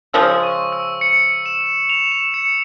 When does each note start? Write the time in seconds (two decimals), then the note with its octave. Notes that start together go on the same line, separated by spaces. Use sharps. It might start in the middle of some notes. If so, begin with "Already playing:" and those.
0.14 C#3 F3 G#3 E6
0.43 C#6
0.72 E6
1.01 C#7
1.46 E7
1.90 F7
2.12 E7
2.34 C#7